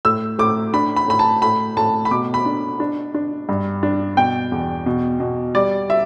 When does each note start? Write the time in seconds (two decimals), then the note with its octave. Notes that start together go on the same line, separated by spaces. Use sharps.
0.05 A2 E6
0.39 A2 D6
0.74 D4 B5
0.96 B5
1.08 A2 B5
1.19 A5
1.42 A2 B5
1.77 A2 A5
2.05 B5
2.11 B2 D6
2.34 B5
2.46 D4
2.80 D4
3.14 D4
3.49 G2
3.83 D4
4.17 B2 G5
4.52 E2
4.86 B2
5.20 B2
5.55 G3 D5
5.90 E5